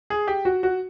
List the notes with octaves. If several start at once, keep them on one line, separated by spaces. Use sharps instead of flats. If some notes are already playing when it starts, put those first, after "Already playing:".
G#4
G4
F#4
F#4